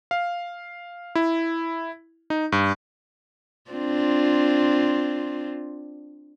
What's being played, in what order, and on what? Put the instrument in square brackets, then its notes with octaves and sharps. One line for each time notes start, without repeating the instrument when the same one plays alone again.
[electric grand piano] F5
E4
D#4
G2
[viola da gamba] C4 D4 F4